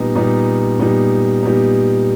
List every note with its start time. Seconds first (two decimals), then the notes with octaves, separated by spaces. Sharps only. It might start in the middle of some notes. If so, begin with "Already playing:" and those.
Already playing: A#2 G3 B3 D#4
0.15 A#2 G3 B3 D#4
0.79 A#2 G3 B3 D#4
1.43 A#2 G3 B3 D#4